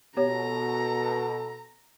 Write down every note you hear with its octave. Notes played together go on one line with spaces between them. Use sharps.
B2 B3 G4 A4 C#5 A#5